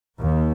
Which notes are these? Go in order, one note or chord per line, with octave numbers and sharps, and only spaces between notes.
D#2